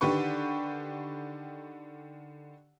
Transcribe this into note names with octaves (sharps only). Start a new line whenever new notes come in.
D3 D#3 G4 B4 C#6